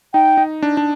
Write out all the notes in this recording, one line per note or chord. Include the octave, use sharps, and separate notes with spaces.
D#4 G5
D#4
D4
D4